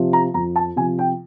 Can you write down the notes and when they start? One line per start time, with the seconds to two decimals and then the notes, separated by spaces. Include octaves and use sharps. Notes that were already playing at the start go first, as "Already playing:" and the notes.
Already playing: C3 F3
0.13 A#5
0.34 F2 A#5
0.56 A5
0.76 C3 F3 G#5
0.99 G5